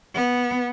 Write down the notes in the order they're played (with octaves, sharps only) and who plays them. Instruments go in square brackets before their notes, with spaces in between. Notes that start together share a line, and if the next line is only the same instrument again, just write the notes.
[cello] B3